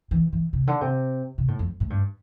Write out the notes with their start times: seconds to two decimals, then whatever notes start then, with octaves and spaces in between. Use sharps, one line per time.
0.11 E3
0.33 E3
0.53 C3
0.67 D3
0.81 C3
1.38 C3
1.48 A2
1.59 F2
1.80 A2
1.90 G2